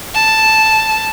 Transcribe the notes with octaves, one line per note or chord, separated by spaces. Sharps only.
A5